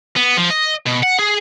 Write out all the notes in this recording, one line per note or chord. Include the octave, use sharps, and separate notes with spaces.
B3
F3
D#5
B2
F#5
G#4